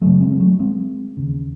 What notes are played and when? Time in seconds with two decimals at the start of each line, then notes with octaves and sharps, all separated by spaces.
0.01 F#1 F#2 C#3 F#3 A3
0.21 G#3 C4
0.31 C4
0.40 F#3 A3
0.59 G#3 C4
1.17 E1 D#2 C#3